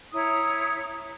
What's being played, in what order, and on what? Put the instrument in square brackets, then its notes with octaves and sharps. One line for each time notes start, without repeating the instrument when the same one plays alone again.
[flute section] E4 C#5 A#5 D#6